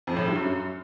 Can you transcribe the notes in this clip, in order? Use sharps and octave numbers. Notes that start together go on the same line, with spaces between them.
F2
A2
G2
F#2